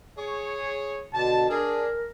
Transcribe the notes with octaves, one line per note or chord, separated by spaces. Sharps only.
G#4 C#5
B2 D3 A5
D4 G#4 A#4